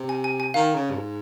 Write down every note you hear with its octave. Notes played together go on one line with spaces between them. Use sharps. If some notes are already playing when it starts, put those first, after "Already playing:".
Already playing: C3
G#5
G#5
G#5
D#3 F5
C#3
G2
G#2